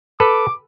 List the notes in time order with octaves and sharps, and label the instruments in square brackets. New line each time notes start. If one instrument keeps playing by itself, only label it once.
[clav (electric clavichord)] A4 B4 [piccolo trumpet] D6